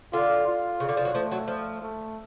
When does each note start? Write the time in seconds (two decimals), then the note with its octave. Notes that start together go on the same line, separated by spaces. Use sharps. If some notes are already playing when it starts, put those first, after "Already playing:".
0.13 D3 F4
0.47 F4
0.80 C#3
0.89 D3
0.97 F3
1.05 F#3
1.15 F3 A3
1.32 F#3
1.48 F3
1.82 A3